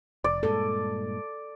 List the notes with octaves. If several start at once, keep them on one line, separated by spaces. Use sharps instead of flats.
F1 D5
G2 A#2 G#3 A4